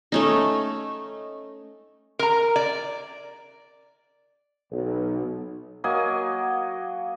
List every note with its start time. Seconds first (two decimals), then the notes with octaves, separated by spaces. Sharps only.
0.12 A3 C#4 D#4
2.19 A#4 A#5
2.56 D5
4.71 B1
5.84 F#3 A#3 D#5 G#5